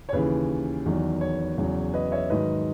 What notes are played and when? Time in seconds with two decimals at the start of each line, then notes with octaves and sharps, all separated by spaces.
0.09 C#5
0.13 D#2 C#3 E3 B4
0.86 E2 D#3 F#3
1.21 C#5
1.58 E2 C#3 F#3
1.93 B4 D#5
2.12 C#5 E5
2.30 G#2 D#3 F#3 B4 D#5